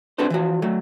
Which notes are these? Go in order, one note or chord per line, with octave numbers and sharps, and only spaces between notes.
C4 D4 F#4 A4 B4 C5
E3 F3 F#4
F#3 A3